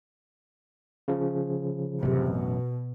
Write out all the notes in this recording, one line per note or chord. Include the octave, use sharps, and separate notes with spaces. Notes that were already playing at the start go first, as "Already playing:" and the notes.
C#3 F3
A1 F#2 C3
B2